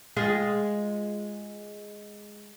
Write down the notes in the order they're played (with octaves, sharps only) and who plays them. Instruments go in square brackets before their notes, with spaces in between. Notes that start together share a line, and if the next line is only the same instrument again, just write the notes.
[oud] G#3 F4 G#4